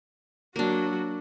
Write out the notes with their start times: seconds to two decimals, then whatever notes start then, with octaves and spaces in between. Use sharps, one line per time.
0.56 F#3 A#3 D4 F#4